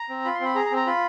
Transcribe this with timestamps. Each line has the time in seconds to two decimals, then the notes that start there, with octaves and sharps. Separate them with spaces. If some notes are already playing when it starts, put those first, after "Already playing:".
Already playing: A#5
0.09 C4
0.25 F4 B5
0.35 C6
0.40 C4
0.45 B5
0.55 G#4 A#5
0.66 A#5
0.71 C4
0.76 A#5
0.86 F4 B5